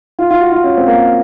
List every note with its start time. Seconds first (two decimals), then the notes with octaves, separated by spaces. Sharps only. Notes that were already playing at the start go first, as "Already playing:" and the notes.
0.19 F4
0.30 F4
0.41 F#4
0.52 F4
0.64 C#4
0.77 C4
0.87 A#3